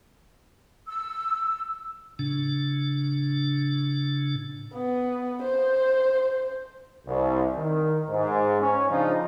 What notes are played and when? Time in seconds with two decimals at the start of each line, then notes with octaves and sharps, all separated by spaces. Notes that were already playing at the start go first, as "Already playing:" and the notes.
0.87 E6
2.19 A2 C#3 D4
4.73 B3
5.42 C5
7.07 C2
7.56 D#3
8.09 G#2
8.61 C#4
8.90 C#3 F3 D4 D#4 F4